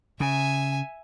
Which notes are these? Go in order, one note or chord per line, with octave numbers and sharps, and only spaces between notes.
C#3 E5 G#5